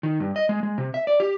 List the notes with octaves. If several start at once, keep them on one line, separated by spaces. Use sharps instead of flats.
D#3
G2
D#5
G#3
G#3
C3
E5
D5
G4